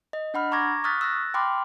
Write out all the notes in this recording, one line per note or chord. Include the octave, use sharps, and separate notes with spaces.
D#5
D4 F#5 B5 F6
A#5 C#6 D6 G#6 A#6
C#6 D#6 F6 F#6 A6 B6
E6 F#6 A6 A#6
G5 B5 C6 D6 F6